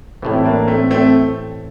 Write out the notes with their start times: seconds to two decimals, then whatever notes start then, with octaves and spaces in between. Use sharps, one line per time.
0.22 A1 A2 E3 A3 C4
0.35 E4
0.44 A#3 D4
0.68 A3 C4
0.91 A3 C4